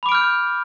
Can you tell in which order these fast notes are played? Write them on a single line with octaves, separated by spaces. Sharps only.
B5 D6 D7 F6 G6